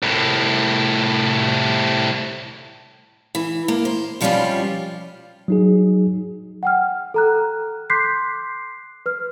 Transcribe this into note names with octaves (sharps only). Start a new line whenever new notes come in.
C2 A2
E3
A#3
C5
B2 F3 G3 C#4 F4 G4
F#3 D#4 G#4
F#5 G5 F6
A4 A#5 F#6
C6 D6 F#6 G6 B6 C7
B4 F6